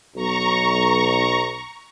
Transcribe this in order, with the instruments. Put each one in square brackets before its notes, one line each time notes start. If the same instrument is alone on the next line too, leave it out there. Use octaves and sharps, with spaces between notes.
[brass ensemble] B1 [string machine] A#5 C#6